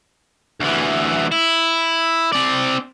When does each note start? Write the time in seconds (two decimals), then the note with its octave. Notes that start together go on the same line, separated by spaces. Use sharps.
0.61 D2 E3
1.32 E4
2.33 C4 D5